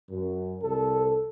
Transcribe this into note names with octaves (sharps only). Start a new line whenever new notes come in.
F#2
C2 A4